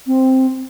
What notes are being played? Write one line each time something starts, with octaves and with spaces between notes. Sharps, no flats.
C4